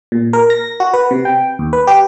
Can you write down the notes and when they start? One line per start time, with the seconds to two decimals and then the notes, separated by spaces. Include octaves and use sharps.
0.12 A#2
0.33 A#4
0.50 A#6
0.80 F#4
0.94 B4
1.11 C3
1.25 G5
1.59 D#2
1.73 B4
1.87 G4